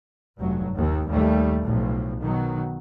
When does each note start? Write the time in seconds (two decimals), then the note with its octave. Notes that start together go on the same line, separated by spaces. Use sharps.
0.39 F1 G2 F#3
0.75 D#2 D#3
1.07 D#2 G3 A3
1.62 B1 A2 F3
2.21 B2 D#3 F#3